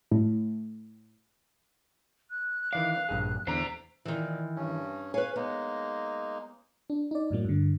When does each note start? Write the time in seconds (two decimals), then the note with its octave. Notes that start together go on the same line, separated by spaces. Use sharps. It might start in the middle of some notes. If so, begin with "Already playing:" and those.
0.11 A2
2.31 F#6
2.73 D#3 E3 D5 F5
3.09 A#1 G2 G#4
3.47 E2 D3 C5 A#5
4.05 A#2 D#3 E3
4.56 G2 C#4
5.14 B4 C#5 F5 G#5
5.36 G#3 A#3 B3 D#4
6.90 D4
7.11 D#4 D5
7.31 F#2 A2 F#3 A#3
7.45 G2 D3